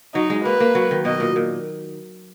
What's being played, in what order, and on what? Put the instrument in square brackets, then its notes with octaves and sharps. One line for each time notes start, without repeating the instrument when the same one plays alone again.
[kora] F#3 [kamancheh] D#4
[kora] G#3
[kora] A#3 [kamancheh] B4
[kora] A#3
F#3
D#3
[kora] B2 [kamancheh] D#5
[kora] A#2
A#2